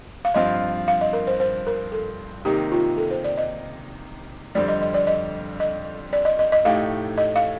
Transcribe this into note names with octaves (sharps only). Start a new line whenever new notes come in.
F5
G2 F3 C4 F4 D#5
F5
D#5
A#4
C5
C5
A#4
A4
C3 D#3 A#3 D#4 G4
F4
A4
C5
D5
D#5
F2 D3 G3 C4 D5
D#5
D#5
D5
D#5
D#5
D5
D#5
D#5
D#5
A2 A3 D#4 G4 F5
D#5
F5